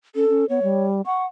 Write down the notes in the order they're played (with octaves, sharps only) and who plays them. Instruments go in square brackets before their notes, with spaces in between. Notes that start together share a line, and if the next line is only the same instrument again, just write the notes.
[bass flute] C#4 [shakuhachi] A4
[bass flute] C#4
[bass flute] B3 [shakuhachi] C#5
[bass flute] G3
[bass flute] F#5 [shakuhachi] C#6